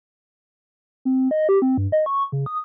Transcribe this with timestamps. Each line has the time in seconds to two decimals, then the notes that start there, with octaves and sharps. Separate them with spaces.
1.05 C4
1.31 D#5
1.49 G4
1.62 C4
1.78 G2
1.92 D#5
2.06 C#6
2.32 C#3
2.46 D#6